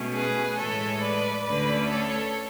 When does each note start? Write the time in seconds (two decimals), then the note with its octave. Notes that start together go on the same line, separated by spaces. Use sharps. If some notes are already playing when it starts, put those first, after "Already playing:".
Already playing: B2 A3 C#4
0.13 G#4 B4
0.56 A2 E3 G#3 A4 C#5
1.00 B4 D5
1.44 D2 D3 A3 C#4 B4 D5
1.88 A4 C#5